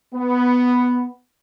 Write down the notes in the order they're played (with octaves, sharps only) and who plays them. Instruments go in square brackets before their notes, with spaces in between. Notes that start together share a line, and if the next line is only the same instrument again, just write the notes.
[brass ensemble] B3